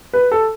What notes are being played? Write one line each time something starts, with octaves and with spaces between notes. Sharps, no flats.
B4
A4